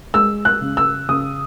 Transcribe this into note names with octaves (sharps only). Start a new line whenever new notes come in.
G#3 E6
F#6
C#3
E6
C#3 D#6